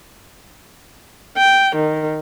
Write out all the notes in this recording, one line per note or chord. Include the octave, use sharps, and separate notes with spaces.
G5
D#3